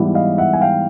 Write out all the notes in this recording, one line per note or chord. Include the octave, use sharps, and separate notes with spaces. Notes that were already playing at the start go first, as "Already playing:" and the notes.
Already playing: G#2 E3 G3 B3
D#5 F5
E5 F#5
G#5
F5 G5